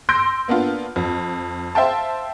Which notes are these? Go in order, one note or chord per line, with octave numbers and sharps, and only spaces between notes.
C6 E6 G6 A#6 D7
A#3 B3 D4 F4
F2
C5 E5 F5 G5 A5